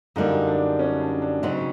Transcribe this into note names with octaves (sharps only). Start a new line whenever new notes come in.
F#2 D3 G3 A#3 D#4
D4
C#4
D4
D4
C#3 F#3 B3 C4 D#4